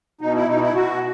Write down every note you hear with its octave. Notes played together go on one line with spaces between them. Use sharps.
B2 D#4
E4
B2 D#4
E4
B2 F#4